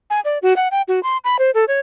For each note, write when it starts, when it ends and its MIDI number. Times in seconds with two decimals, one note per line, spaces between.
0.10 0.20 80
0.25 0.38 74
0.42 0.53 66
0.56 0.68 78
0.71 0.82 79
0.88 1.02 66
1.03 1.17 84
1.24 1.36 83
1.39 1.51 72
1.54 1.65 69
1.68 1.80 73